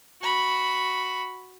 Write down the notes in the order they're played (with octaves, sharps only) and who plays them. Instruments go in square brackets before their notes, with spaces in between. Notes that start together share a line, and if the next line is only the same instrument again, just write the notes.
[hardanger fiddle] F#4 B5